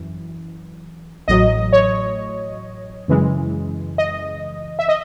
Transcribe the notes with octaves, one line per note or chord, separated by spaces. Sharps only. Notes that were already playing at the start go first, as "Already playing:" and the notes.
Already playing: F#2 E3
A1 A2 F#3 D#5
C#5
F#2 C#3 E3 G#3
D#5
E5
D#5